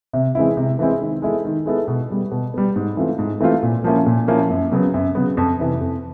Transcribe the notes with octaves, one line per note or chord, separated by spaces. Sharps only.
C3
E3 G#3 C4 E4
C3
E3 G#3 C4 E4
D#3
G#3 B3 E4 A4
D#3
G#3 B3 E4 A4
B2
G3 B3
B2
G3 B3
G#2
E3 A3 C4 F4
G#2
E3 A3 C4 F4
A#2
F3 A#3 C#4 E4
A#2
F3 A#3 C#4 E4
F#2
C#3 F#3 B3
F#2
C#3 F#3 B3
F2
C3 E3
F2